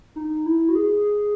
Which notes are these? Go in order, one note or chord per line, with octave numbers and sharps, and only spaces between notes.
D#4
E4
F#4
G#4